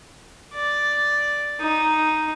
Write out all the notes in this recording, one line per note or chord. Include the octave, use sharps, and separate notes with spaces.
D5
D#4